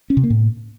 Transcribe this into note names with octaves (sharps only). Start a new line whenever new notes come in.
C#4
C3
A#3
A2